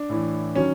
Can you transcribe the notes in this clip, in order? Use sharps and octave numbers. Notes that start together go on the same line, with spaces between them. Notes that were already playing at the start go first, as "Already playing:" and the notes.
Already playing: D4
A2 E3
D#3 F#3 C#4